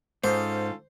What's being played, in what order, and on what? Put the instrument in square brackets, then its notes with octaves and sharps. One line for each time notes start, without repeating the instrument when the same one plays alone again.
[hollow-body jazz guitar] G#2 [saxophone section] C#4 F4 A4 [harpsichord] C5